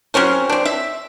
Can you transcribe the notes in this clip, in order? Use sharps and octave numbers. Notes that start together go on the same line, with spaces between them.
F#3 C4 C#4 A#4
C4 D4
E5